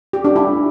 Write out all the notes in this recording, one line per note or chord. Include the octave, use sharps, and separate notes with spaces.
G4
D4
E4